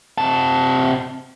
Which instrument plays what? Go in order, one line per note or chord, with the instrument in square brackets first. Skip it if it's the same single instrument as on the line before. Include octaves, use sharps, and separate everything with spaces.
[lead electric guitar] C3 A5